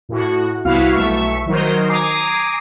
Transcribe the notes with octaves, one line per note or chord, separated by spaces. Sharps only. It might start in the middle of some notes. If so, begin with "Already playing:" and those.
A2 F#4
C2 B3 E4 F#4 F5 F6
B1 A3 E5 C#6
D#3 F#3 D#4 A#4 C5
G#5 A#5 D6 D#6 C7